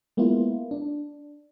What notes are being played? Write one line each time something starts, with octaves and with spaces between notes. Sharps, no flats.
G#3 A#3 B3 E4 F4
D4